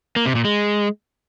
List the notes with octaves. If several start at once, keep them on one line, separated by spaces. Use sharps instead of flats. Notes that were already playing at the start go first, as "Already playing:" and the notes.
A#3
C3
A#2
G#3